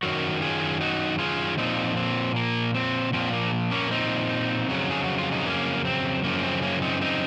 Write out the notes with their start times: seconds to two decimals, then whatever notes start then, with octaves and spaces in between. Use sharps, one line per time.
0.03 F#2 D#3 F#3 F#4 A#4
0.42 F4 G#4
0.81 D#4 F#4
1.19 F4 G#4
1.58 A#2 F3 C4 D#4
1.97 C4
2.36 A#3
2.75 C4
3.13 A#2 F3 C4
3.33 A#3
3.71 A#3 C#4
3.91 C4 D#4
4.68 F2 C#3 F#3
4.91 G#4
5.04 F#4
5.18 F4
5.32 D#4
5.46 A#3 C#4
5.85 C4
6.23 F#2 C#3 F3 A#3
6.43 C4
6.63 A#3 C#4
6.82 C4 D#4
7.02 C4 D#4